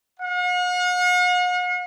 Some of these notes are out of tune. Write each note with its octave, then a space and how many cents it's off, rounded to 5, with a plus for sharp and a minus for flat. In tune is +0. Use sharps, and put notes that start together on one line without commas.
F#5 -45